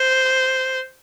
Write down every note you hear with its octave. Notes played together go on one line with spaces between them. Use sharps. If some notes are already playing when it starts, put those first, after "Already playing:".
Already playing: C5